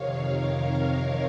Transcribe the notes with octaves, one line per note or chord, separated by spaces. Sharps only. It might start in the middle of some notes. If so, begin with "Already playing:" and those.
Already playing: F2 C3 D#3 C#5 F5
A#4 C#5